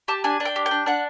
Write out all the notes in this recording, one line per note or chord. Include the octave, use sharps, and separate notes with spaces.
G4 A5
D4 G#5
D4
G5
G4
G5
D4
D4 F#5